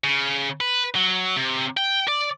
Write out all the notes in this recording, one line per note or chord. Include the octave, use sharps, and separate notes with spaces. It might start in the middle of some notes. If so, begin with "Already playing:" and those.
C#3
B4
F#3
C3
G5
D5